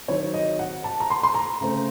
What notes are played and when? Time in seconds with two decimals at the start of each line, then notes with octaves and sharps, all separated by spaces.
0.08 D#3 F#3 C4 C#5
0.34 D#5
0.59 F#5
0.84 A5
1.00 A#5
1.10 C6
1.23 C6
1.34 A#5
1.61 C#3 A3 C4